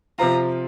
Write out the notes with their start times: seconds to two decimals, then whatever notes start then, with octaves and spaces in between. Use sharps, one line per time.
0.19 C3 F3 C4 F4 A#5